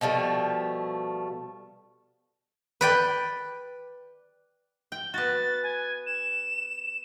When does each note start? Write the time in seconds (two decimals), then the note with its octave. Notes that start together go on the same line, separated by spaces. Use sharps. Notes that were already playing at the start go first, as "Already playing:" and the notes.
0.01 B2 F3 G3 A3
2.81 B4 D5 G5
4.92 G5
5.14 B3 F#4 A6
5.63 G#5
6.06 E7